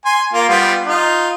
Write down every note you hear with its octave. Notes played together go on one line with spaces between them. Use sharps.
G#5 C6
A#3 F4 C6
G3 B3 F4
D#4 F4